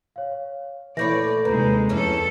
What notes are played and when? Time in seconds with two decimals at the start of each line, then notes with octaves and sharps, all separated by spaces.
0.16 C#5 F5
0.97 A#2 E3 A3 C#5 D5 B5 G6 A#6
1.45 D#2 C3 G#3 B4 A#5 G6
1.89 F2 C#4 D4 E4 A4